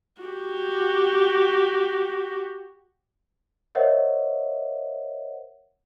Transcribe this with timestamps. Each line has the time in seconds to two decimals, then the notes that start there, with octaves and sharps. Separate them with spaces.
0.22 F#4 G4
3.75 A#4 C5 C#5 D#5 E5 F#5